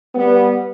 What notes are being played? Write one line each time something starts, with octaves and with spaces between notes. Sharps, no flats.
G3 B3